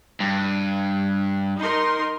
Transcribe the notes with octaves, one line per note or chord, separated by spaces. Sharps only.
G2
D#4 A#4 C6